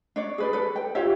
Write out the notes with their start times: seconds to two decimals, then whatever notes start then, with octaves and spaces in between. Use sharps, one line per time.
0.16 D4 C#5 D5
0.38 G#4 B4 D5
0.53 A4 B4
0.76 G5
0.95 F4 G4 C#5 E5